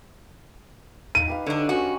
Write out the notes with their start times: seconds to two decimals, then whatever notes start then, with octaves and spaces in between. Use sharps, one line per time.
1.15 D#4 F5 D#7
1.28 G4 B4 F5
1.46 D3 D4 C#5 D#5
1.69 C4 C#4 D#4 F#4